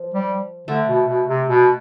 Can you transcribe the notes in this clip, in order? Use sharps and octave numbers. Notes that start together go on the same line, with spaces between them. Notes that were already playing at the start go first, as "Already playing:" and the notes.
Already playing: F3
G3
D3 A3
B2
B2
C3
B2